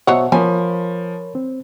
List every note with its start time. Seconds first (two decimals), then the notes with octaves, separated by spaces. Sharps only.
0.07 B2 F#3 C5 C#5 D#5 E5 F#5
0.32 F3 A#4 C#5 G#5 B5
1.35 C4